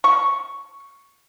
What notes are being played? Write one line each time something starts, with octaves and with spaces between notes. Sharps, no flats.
C#6